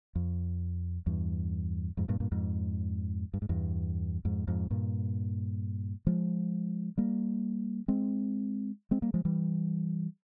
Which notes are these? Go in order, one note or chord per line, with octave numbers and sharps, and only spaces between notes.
F2
E2 G2
F2 G#2
G2 A#2
G2 A#2
F2 G#2
G2
G#2
E2 G2
F2 G#2
F2 G#2
G2 A#2
F3 G#3
G3 A#3
G#3 C4
G#3 C4
G3 A#3
F3 G#3
E3 G3